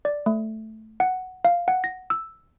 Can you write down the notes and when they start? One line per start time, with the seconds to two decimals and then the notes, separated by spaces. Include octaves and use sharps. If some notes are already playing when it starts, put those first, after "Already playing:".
0.05 D5
0.26 A3
1.00 F#5
1.45 F5
1.68 F#5
1.84 A#6
2.10 E6